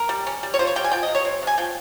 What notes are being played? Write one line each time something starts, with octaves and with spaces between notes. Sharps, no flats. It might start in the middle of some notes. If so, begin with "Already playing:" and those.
Already playing: A#4
G3
C#4
G3
C#5
F4 C5
C#5
G3 G5
G#5
F3 G5
D#5
C3
C#5
C4
C3
G#5
F3 G5